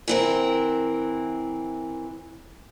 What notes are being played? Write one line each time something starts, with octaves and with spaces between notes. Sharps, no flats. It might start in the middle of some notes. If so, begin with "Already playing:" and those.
E3 C4 A#4